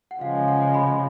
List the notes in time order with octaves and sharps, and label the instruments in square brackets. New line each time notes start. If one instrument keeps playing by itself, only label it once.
[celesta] F#5
[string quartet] C#3 F3 G#3 [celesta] F5
[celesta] F#5
B5